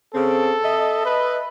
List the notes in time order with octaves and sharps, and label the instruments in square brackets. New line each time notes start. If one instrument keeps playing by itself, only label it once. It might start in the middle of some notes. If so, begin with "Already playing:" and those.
[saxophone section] C#3 C4 [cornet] A4
[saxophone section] D#5 E5
[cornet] B4